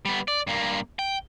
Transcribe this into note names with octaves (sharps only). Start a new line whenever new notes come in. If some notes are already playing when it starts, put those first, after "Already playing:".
G3 B3
D5
G2 A#3
G5